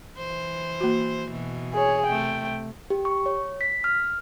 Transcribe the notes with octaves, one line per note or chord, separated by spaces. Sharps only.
E3 C5
A#3 F#4
B2 E3
G#4 C#5
C3 A3 G5
G4
C#6
C#5
B6
F6